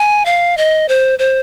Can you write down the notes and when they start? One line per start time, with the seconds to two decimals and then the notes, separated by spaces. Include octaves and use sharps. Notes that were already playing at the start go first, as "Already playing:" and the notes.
Already playing: G#5
0.26 F5
0.57 D#5
0.88 C5
1.19 C5